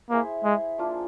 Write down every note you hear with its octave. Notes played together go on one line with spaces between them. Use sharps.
A#3 E4 G#4 C5 E5
G#3
F3 A#3 D4 F4